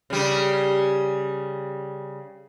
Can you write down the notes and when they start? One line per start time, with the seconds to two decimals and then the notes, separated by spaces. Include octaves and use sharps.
0.10 C#3 G3